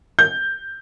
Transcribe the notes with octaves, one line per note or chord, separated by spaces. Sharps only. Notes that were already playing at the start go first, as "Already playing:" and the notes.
G6